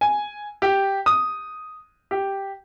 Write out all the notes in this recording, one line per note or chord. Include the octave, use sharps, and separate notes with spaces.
G#5
G4
D#6
G4